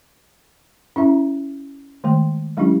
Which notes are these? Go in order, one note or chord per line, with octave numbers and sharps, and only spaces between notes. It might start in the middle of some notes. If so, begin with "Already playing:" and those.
C#4 E4 E5 A#5
D#3 G#3 A3
F#3 G#3 C#4 D4 E4 G4